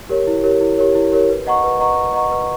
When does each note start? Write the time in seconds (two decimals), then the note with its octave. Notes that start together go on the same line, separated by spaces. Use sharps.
0.09 G4 A#4 C#5
0.27 E4
0.43 G4 A#4 C#5
0.61 E4
0.78 G4 A#4 C#5
0.95 E4
1.12 G4 A#4 C#5
1.30 B4
1.47 D#5 F#5 A#5 C#6
1.64 B4
1.80 D#5 F#5 A#5 C#6
1.98 B4
2.14 D#5 F#5 A#5 C#6
2.31 B4